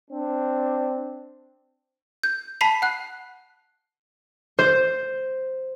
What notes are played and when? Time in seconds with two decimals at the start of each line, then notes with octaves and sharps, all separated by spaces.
0.11 C4 D4
2.23 G6
2.61 A5 B5 B6 C7 F7
2.82 F#5 F#6
4.59 C5